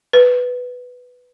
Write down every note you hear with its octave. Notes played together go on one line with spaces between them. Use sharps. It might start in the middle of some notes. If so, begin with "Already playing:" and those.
B4